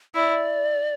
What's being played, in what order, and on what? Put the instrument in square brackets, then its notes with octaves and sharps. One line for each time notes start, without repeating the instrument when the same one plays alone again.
[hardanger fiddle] E4 [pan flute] D5